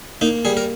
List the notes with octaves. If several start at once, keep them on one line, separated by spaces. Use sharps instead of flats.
A#3 D#4
G3 G#4
A#4